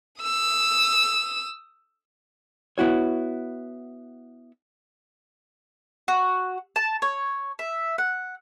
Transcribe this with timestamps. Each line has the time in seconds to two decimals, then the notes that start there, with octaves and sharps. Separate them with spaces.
0.22 D#6 E6
2.78 B3 E4 F#4 C#5
6.08 F#4
6.76 A5
7.02 C#5
7.59 E5
7.98 F#5